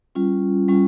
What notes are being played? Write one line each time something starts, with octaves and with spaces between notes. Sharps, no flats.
G3 C#4 F4
G3 C#4 F4